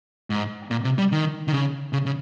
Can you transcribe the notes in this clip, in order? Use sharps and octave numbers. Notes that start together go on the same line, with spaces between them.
G#2
A#2
C3
G3
D#3
D#3
C#3
C#3
C#3